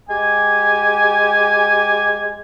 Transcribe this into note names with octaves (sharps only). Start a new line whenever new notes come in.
G#3 G4 G#5